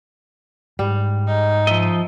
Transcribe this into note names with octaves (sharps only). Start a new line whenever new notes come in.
G#2 G3
D#4
F3 D#5 E5